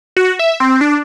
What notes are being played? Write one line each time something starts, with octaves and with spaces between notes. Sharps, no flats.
F#4
E5
C4
D4